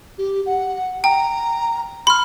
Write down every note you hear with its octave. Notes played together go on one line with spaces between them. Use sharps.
G4
F#5
G5 A#5
B5 C6 F6